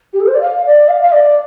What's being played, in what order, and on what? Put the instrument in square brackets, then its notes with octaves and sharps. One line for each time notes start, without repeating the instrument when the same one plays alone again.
[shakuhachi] G4
A4
C5
D5
F5
D5
F5
F5
D5